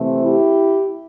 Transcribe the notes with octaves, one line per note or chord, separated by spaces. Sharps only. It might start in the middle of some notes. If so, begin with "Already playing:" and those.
Already playing: C3 E3 A3 C4
E4 G4